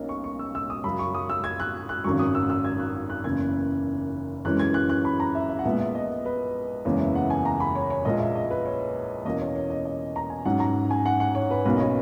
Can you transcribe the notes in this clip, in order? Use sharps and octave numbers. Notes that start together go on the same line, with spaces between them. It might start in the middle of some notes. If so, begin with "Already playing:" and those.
Already playing: B1 B2 A#3 C#4 C#5 D#5
C#6
C#6
E6
E6
D#6
F#2 C#3 F#3 B5
C#6
D#6
E6
G#6
F#6
F#6
G#1 F#2 C#3 F#3 C#6
D#6
E6
E6
G#6
F#6
F#6
F#1 E2 C#3 G#6
F#2 E3 G#3 C#4 F#6
G#6
F#6
F#6
B5
A#5
E5
E5
F#5
A#1 A#2 G#3 B3 E5
E5
D#5
B4
F#1 E2 C#3 G#3 B3 C#5
E5
F#5
G#5
A#5
B5
C#5
C#5
A#1 A#2 G#3 D#5
E5
D#5
B4
C#5
E2 B2 A#3 C#4 D#5
C#5
C#5
D#5
D#5
A#5
G#5
G#2 F#3 C#4 F#5
A#5
G#5
F#5
F#5
C#5
B4
B1 B2 A#3 C#4 B4
D#5
C#5